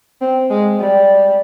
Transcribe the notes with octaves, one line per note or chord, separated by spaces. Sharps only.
C4
G#3
G3